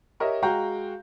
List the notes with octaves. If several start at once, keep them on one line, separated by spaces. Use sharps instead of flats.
G4 A#4 C#5 D#5 E5
G#3 F#4 F5 G5 A#5 G6